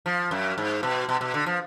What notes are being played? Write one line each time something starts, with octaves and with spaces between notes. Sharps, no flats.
F3
F#2
G#2
B2
B2
B2
D3
F3